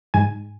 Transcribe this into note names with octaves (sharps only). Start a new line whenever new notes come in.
G#2 G#5